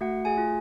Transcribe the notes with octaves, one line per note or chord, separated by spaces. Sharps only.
A3 F#4 F#5
G#4 G#5
F4